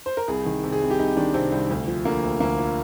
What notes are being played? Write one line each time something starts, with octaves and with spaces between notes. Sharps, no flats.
C5
A#4
C2 G#4
D#3
C3
G#4
C2
G4
C2 D#4
D#3 D4
C3 C4
C2
D2
F3
D3 A#3
D2
D2 A#3
F3